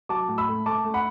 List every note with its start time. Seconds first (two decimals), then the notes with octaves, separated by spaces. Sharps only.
0.09 F#3 A5 D6
0.29 A2
0.38 B5 E6
0.48 A3
0.66 A3 A5 D6
0.85 A3
0.94 F#5 B5